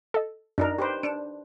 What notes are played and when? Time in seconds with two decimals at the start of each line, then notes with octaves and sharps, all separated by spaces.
0.14 A4 D#5
0.58 F#2 D4 D#4 A#4
0.78 G4 B4 C5
1.03 D4 C#7 D7 E7